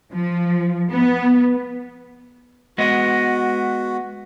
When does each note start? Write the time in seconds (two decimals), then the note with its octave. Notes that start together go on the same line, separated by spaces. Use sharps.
0.12 F3
0.91 B3
2.78 G#3 B3 F#4 D#5